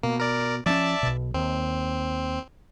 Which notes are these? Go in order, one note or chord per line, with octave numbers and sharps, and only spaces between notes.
B2 A#3
A#4 D5
F3 C4 C#4 D5 E5 A5
B1 B2
D#2 C4